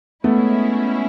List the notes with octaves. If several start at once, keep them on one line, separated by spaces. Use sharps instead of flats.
G#3 A3 B3 C#4 E4 G#4